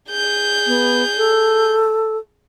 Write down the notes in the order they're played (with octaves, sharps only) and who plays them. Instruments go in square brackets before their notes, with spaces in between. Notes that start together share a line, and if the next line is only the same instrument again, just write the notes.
[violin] G#4 G6
[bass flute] B3
A4